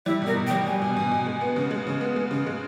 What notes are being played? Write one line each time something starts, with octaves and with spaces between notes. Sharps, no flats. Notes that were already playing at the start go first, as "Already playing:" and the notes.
G3 E4
B2 A#4
B2
G5
G3
G3 G#5
B2
B2
B2
G#3
B3
C#3
G#3
C#3
B3
G#3
C#3
G#3